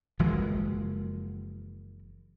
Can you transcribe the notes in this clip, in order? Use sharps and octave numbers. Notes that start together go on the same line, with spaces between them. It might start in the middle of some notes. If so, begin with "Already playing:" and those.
F#1 E3 F3 G#3